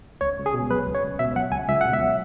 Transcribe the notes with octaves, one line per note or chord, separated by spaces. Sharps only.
C#2 C#5
C#2
G#4
B2
F#3 B4
C#2
C#5
C#2
B2 E5
F#3 F#5
C#2 G#5
C#2 E5
B2 F#5
E5
F#3